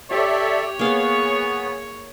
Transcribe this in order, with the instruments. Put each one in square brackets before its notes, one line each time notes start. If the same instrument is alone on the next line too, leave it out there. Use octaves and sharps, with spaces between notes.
[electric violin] G4 [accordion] A4 D5 E5 [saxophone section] C#5
[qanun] A#3 F5 [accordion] B3 [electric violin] G#4